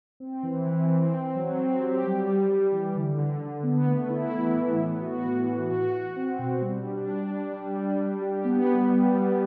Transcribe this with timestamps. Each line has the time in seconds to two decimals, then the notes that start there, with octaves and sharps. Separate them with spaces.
0.20 C4
0.43 E3
0.66 E3
0.89 C4
1.12 C4
1.35 F#3
1.58 C4
1.80 G4
2.04 G3
2.27 G3
2.49 G3
2.72 E3
2.95 D3
3.18 D3
3.41 D3
3.63 B3
3.87 A3
4.10 E4
4.33 E3
4.55 A2
4.78 B3
5.01 F#4
5.24 E3
5.47 E3
5.70 F#4
5.93 F#4
6.16 C4
6.39 B2
6.61 G3
6.84 D4
7.07 D4
7.30 D4
7.53 G3
7.76 G3
7.99 G3
8.22 G4
8.45 B3
8.67 G3
8.90 G3
9.13 G3